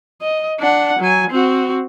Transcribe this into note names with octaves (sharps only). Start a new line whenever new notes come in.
D#5
D4 F#5
F#3 G#5
C4 F#4